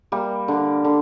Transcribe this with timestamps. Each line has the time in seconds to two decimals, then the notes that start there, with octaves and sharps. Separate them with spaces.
0.12 G3 A#3
0.48 D3
0.84 D3